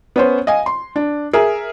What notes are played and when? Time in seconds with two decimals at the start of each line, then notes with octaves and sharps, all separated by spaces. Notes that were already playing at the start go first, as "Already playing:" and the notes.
0.16 B3 C#4 C5
0.47 D#5 F5 G#5
0.66 C6
0.96 D4
1.33 G#4 A#4 E5